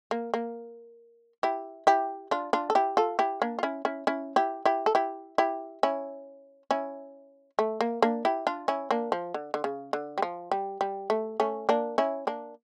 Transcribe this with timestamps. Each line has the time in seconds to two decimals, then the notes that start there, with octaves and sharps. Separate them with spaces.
0.11 A#3
0.34 A#3
1.43 E4 G4
1.87 E4 G4
2.31 D4 F4
2.53 D4 F4
2.70 A4
2.75 E4 G4
2.97 F4 A4
3.19 E4 G4
3.42 A#3 D4
3.59 F4
3.63 C#4 E4
3.85 C#4 E4
4.07 C#4 E4
4.36 E4 G4
4.65 E4 G4
4.86 A4
4.95 E4 G4
5.38 E4 G4
5.83 C#4 E4
6.71 C#4 E4
7.59 A3
7.81 A#3
8.02 A#3 D4
8.25 E4 G4
8.47 D4 F4
8.68 C#4 E4
8.91 A#3 D4
9.12 F3
9.34 D3
9.54 D3
9.64 C#3
9.93 D3
10.18 G3
10.22 F3
10.52 G3
10.81 G3
11.10 A3
11.40 A3 C#4
11.69 A#3 D4
11.98 C#4 E4
12.27 A#3 D4